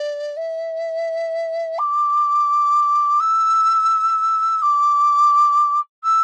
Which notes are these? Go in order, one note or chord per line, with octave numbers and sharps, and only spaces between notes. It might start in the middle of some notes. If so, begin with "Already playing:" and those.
Already playing: D5
E5
D6
E6
D6
E6